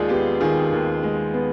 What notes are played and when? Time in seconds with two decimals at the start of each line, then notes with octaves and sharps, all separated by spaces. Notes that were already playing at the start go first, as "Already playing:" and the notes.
Already playing: D#2 D#3 G#3 F4 G#4 D5
0.09 B3 G4
0.40 D#3 F4 G#4
0.72 D#2
1.03 G#3
1.34 B3